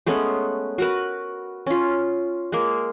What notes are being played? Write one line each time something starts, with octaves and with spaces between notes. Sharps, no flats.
G#3 A3 B3 C#4
F#4 A#4 B4
C#4 F4
G#3 A#3